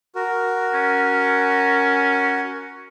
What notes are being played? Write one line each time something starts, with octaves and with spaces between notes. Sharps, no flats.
F#4 A#4
C#4